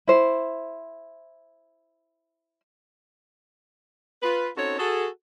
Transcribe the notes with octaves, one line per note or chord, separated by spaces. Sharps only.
E4 C5
F4 B4
C4 C#4 D#4 F#4 A4 C#5
F#4 G#4 A4